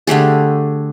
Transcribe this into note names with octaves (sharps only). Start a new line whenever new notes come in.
D3 A3 G4 G#4